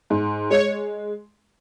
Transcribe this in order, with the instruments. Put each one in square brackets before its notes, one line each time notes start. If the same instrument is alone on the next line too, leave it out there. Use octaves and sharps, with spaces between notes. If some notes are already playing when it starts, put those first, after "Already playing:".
[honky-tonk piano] G#2
[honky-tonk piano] G#3 [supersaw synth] C#5